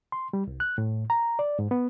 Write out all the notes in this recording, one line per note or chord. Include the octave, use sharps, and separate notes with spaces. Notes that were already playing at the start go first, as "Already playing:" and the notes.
C6
G3
C2
F#6
A2
A#5
D5
G#2
B3